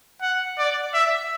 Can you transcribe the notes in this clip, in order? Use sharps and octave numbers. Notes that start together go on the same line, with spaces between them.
F#5
D5
E5